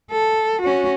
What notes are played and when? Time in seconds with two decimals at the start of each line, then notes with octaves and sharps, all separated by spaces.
0.11 A4
0.62 C#4 F#4